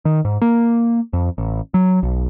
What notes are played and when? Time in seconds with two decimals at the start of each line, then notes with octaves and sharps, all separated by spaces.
0.05 D#3
0.25 G#2
0.41 A#3
1.13 F2
1.38 A1
1.74 F#3
2.03 B1